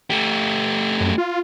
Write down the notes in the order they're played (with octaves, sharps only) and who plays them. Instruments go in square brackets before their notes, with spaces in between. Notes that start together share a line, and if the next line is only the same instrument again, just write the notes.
[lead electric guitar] A3 G4
[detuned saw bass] F#2
F4